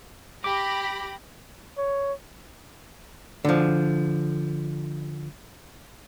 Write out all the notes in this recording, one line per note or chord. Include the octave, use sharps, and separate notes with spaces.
G4 B5 D6 A#6
C#5
D3 F3